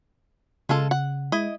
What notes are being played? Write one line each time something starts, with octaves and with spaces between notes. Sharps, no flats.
C#3 G#3 F4 A4
F#5
G#3 E4 D#5